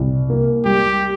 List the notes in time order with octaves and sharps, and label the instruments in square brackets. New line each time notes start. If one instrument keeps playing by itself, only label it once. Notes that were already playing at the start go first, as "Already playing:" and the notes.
Already playing: [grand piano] C2
A#3
[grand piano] G3 [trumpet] G4